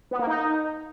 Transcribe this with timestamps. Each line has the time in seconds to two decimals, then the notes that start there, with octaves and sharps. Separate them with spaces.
0.11 B3
0.19 A#3
0.27 D#4